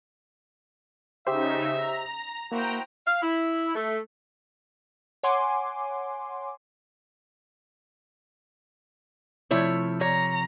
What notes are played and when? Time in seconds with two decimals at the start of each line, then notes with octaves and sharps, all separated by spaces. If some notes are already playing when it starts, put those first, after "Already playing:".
1.27 C#3 D#4 G4 C5 E5
1.75 A#5
2.52 A#3 E4 F#4 C5 G5 A#5
3.07 F5
3.22 E4
3.75 A3
5.23 C#5 F#5 G#5 C6 D6
9.51 C3 F3 A3 E4 C#5
10.01 C#5 A#5